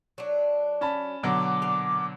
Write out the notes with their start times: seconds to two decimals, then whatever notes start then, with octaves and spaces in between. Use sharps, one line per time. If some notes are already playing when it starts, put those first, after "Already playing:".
0.18 F#3 D4
0.81 C#4 A5 B5
1.23 B2 D3 F#3 D6
1.62 A#2 F5